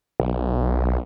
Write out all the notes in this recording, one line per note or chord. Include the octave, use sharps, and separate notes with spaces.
B1